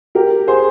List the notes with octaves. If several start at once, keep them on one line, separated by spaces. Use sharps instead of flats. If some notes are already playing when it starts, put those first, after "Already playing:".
G4 A#4
A#4
G#4 C5